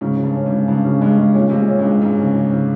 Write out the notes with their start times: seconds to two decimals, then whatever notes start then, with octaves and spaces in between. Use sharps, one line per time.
0.01 G#2 C#3
0.17 C#3
0.23 G2
0.35 C#4
0.46 G#2
0.51 C#3
0.68 G2 C#3
0.85 C#3
1.01 G2 G#3
1.19 G#3
1.34 A#2 C#4
1.50 C3 G#3
1.57 A#2
1.68 C#4
1.79 G2
1.85 G#3
2.02 G#2 G#3
2.19 C#3
2.35 C#3
2.51 C#3